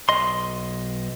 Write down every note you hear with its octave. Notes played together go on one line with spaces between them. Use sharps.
B1 D#5 C6